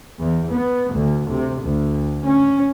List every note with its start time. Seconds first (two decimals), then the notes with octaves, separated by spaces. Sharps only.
0.19 E2
0.51 B3
0.94 D2
1.30 C3
1.62 D2
2.26 C#4